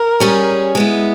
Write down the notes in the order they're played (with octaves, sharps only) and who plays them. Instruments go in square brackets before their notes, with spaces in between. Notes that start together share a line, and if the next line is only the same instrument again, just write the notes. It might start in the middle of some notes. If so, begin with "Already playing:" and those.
Already playing: [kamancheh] A#4
[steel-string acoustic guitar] G3 C#4 G#4
G#3 B3 E4